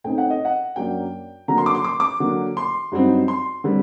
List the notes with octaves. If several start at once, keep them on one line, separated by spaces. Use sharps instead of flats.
A2 A3 C4 D#4 G5
F#5
D#5
F#5
F#2 F#3 A#3 D4 G5
D3 F#3 A#3 A#5
C6
D6
C6
D6
D6
D3 F#3 A#3
C6
G2 F#3 C4 D#4
C6
D3 G3 C4